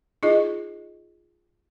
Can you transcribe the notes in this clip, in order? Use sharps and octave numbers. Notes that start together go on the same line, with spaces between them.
D#4 F4 G#4 D#5